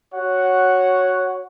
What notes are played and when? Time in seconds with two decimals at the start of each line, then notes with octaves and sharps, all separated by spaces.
0.13 F#4 C#5 F#5